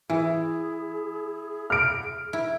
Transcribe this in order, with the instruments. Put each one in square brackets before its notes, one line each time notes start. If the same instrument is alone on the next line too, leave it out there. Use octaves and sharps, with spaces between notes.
[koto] E3 [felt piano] E4 [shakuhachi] G#4
[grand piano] F6 D7
[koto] E4